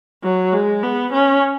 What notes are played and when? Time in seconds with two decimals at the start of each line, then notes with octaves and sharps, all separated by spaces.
0.23 F#3
0.53 G#3
0.83 B3
1.13 C#4